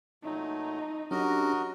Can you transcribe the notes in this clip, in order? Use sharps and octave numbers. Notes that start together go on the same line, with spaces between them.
A#2 F#3 A3 D#4
F#3 C#4 D4 F#4 G4 A#4 D#5